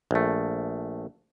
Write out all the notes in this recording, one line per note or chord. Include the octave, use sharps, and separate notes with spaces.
A#1 A3